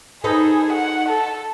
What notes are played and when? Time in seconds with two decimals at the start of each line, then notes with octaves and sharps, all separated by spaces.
0.24 D#4 G#4 A4 B4
0.73 F#5
1.09 A4